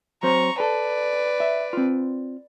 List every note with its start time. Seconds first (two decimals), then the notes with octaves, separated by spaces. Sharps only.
0.23 F#3 C4 C5 A#5 C#6
0.60 A4 B4 D5
1.40 E5
1.73 C4 F4